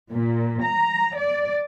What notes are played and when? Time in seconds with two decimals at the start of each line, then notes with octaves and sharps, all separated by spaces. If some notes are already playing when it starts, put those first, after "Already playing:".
0.12 A#2
0.65 A#5
1.17 D5